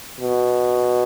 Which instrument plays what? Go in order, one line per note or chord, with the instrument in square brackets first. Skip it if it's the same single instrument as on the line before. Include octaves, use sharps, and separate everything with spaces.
[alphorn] B2